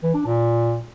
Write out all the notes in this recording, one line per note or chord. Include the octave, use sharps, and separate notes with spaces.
E3
D4
A#2